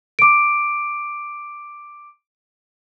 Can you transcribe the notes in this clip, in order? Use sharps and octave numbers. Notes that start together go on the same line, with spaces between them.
D6 D7